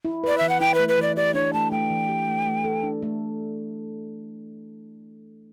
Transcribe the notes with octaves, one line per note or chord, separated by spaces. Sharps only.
E4
B4 D5
E3 E5
F#5
E4 G5
A3 B4
B4
E3 D5
G4 D5
D4 C#5
A3 A5
A3 G5
E3
G4
A3
A3
A4
D4
A3